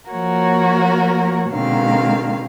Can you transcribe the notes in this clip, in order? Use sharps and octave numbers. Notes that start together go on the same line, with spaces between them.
F3 A#3 F#4 A#4 C#5
B2 D3 D#3 G#3 C4 F5